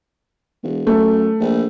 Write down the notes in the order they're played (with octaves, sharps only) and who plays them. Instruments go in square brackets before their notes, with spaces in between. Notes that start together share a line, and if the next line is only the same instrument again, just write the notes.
[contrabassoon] E1
[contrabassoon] F#2 [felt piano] A3
[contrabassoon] A#1